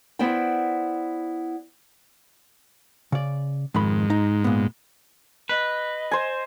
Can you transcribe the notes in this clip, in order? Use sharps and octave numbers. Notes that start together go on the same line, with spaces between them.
B3 E4 C5 D5 G5
C#3 D5
F2 G#2 D#3 B5
D#4
A#2 B3
B4 D#5
C5 G#5